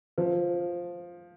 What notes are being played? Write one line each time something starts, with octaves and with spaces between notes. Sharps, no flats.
F3